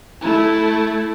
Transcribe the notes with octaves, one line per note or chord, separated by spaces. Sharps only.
A3 E4